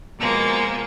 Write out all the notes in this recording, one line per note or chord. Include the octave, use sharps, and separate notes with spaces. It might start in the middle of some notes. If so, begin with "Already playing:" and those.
B2 F3 G#3 A#3